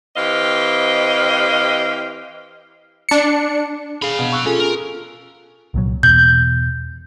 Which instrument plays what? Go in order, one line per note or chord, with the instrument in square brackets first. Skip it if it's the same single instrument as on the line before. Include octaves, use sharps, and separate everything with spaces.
[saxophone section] E3 C4 G4 D#5 F5
[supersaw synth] D4 C#7
[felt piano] G#4 [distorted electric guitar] F5 B5
[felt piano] B2
C#6 E6 F#6
[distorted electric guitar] C#4 [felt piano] F4 G#4 A4
[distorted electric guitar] A#4
[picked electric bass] C2 A#2 F#3
[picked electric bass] E2 B2 [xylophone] G6